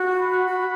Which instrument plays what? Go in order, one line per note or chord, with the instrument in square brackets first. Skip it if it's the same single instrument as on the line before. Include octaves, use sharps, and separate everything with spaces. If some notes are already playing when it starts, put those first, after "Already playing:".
Already playing: [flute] F#4
[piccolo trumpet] B5
[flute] F#4
F#4